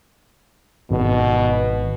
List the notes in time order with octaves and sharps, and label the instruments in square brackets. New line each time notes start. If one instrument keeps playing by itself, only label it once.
[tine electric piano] G#1 [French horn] B2